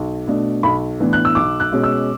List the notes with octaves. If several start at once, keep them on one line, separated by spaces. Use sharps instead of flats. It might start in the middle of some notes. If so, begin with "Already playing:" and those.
Already playing: B1
B2 A3 D4
B1 B5
A2 E3 B3 D4
F#6
E6
B1 D6
F#6
B2 G#3 C#4
E6